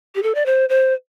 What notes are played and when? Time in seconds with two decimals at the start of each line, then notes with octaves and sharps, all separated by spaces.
0.15 G4
0.23 A4
0.35 D5
0.46 C5
0.69 C5